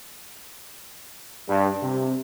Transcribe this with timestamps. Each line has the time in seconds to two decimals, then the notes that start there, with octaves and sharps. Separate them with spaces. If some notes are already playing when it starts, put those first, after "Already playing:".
1.49 G2
1.81 C3